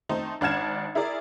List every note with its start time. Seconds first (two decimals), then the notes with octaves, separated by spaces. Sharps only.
0.09 D#3 A3 C4 D#4 C5
0.41 G#1 D4 F#5 F6 G#6 E7
0.95 E4 G#4 A#4 D5